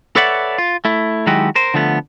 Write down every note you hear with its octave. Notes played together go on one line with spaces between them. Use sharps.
A4 B4 C#5 D5 E5 F#5
F4
A3 E4
D#3 F#3 G#3 E4 F#4 G4
A#4 C5
D3 F3 A3 B3